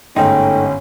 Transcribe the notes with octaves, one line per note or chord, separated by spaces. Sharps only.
G1 G#2 A3 C#4 D#4 G5